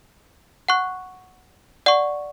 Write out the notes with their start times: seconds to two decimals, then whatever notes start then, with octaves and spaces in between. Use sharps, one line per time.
0.68 F#5 C#6 F#6
1.86 D5 F#5 C#6